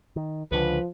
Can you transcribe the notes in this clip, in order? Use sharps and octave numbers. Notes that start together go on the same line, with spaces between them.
D#3
C#2 D3 F3 B4